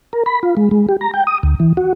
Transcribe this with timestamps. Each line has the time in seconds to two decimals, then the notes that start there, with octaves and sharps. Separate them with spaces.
0.13 A#4
0.26 B5
0.43 F4
0.57 G#3
0.71 G#3
0.89 G4
1.01 A#5
1.14 G5
1.27 D#6
1.43 D2
1.60 E3
1.77 F#4